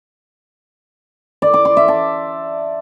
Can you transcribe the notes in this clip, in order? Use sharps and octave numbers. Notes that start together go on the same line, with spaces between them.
D5
D6
C6
E5
A5